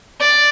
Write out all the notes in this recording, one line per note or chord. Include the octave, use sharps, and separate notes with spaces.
D5